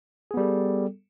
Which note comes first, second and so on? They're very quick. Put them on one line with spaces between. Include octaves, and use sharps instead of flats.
G#4 B3 G3 A4